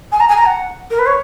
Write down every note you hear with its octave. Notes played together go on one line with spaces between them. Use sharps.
G#5
A#5
G#5
A#5
F#5
A#4
B4
C#5